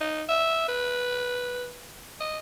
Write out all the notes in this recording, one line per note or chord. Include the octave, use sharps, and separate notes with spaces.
D#4
E5
B4
D#5